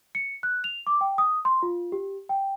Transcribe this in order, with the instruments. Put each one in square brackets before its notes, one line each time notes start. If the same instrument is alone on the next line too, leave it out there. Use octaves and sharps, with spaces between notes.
[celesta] C#7
F#6
F7
D6
G5
D#6
C6
F4
G4
G5